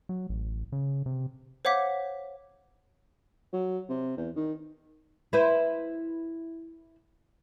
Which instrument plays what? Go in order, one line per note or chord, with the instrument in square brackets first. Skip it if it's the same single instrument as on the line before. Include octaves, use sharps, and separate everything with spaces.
[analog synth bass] F#3
A1
C#3
C3
[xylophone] C5 C#5 F5 F#5 D6 B6
[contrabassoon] F#3
C3
E2
D#3
[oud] E4 B4 C5